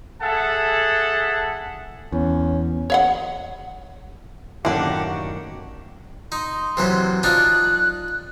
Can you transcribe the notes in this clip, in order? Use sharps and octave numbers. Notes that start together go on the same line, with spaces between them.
G#4 A4 E5 F#5 A5
E2 C#4
C#5 F5 F#5
F#2 A2 D3 D#3 A#3 D4 G4 F#5
F#4
D#4 C6
C3 E3 F#3
D4 D#4 F4 F#6